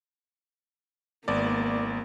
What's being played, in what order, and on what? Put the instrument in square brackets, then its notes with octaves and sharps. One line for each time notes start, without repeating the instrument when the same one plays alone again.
[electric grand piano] G#1 B3 D5 [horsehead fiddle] A#3